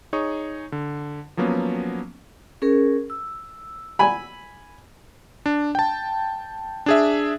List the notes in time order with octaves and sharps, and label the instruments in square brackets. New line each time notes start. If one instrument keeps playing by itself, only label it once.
[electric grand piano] D#4 G#4 C#5 C#6 D#6
D3
F3 F#3 A#3 B3 C#4
[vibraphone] C#4 G#4 A#4
E6
[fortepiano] G#5 B5
[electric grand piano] D4
G5 A5
D4 G#4 E5